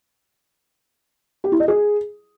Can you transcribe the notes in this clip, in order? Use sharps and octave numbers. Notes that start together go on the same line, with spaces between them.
G4
E4
D#5
G#4